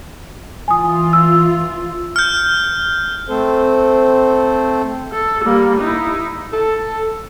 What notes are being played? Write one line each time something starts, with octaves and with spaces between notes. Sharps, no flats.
E3 F4 G#5 D#6
E6
F6 G6
A3 C4 A4 C5
A4
G3 A#3
D#4 E4
A4